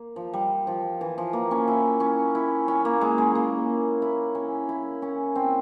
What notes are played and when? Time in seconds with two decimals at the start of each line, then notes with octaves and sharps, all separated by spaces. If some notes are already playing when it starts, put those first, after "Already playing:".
Already playing: A#3
0.16 F3
0.33 G3
0.67 F3
1.01 E3
1.18 F3
1.33 A#3
1.51 C#4
1.68 E4
2.00 C#4
2.35 E4
2.68 C#4
2.85 A#3
3.01 G#3
3.18 G#3
3.35 A#3
4.02 E4
4.35 C#4
4.69 E4
5.02 C#4
5.36 C4